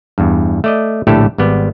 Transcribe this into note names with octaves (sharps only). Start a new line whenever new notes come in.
E2 G2
A3 D5 D#5
A#1 A2 D3 A3 G4 A4
G#1 G3 B3 D5